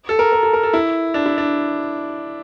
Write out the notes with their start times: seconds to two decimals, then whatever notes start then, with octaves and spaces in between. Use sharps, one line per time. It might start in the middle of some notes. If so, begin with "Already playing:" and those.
0.09 A4
0.19 A#4
0.32 A#4
0.43 A4
0.53 A#4
0.63 A4
0.73 E4
1.14 D4
1.26 E4
1.38 D4